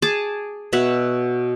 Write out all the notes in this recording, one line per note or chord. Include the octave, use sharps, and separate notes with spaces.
G#4 A5 D6
B2 C#5 E5 F#5